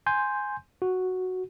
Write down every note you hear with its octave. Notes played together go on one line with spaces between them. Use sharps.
G#5 C6 G6
F#4